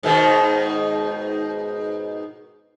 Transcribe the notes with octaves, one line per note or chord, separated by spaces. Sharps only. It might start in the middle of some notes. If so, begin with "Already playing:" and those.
G#2 B2 D#3